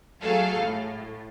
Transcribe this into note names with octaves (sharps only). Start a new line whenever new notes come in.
F#3 A3 G#4 A4 F5
A2